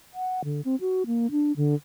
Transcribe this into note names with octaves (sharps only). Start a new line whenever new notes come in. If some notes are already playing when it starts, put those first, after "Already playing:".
F#5
D3
C4
F#4
A#3
D4
D3